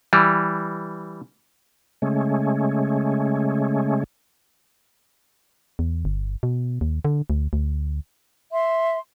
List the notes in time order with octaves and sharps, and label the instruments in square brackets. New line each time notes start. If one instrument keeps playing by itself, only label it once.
[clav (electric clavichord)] E3 G3
[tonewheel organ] C#3 G#3 A3 C#4
[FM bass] E2
G1
B2
D#2
D3
D2
D2
[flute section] E5 C6